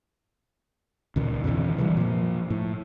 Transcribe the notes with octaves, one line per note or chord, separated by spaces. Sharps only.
C#2 A#2 D#3
F2 B2 D3 E3
C3 E3 F#3 G3
A#2 F3
A2